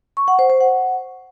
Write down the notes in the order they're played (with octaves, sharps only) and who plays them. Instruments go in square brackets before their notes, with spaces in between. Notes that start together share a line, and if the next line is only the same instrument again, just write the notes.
[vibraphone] C#6
F#5
C5
C5
F#5